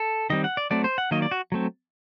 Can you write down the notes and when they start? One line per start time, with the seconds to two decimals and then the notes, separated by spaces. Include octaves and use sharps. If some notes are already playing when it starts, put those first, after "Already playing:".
Already playing: A4
0.30 D#3 G3 C4 D#5
0.44 F#5
0.57 D5
0.71 F#3 A3 C4 D5
0.84 C5
0.98 F#5
1.11 D#3 F#3 A#3 D#5
1.22 D5
1.31 F#4
1.52 F#3 A3 C4